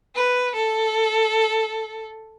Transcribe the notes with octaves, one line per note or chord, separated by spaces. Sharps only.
B4
A4